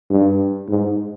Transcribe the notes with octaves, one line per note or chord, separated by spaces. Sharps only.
G2
G#2